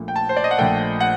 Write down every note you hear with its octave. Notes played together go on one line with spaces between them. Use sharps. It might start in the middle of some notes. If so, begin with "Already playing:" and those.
Already playing: A#1 A#2 A3
G5
A5
C5
D5
D#5
F#5
A#1 A#2 A3 G5
F#5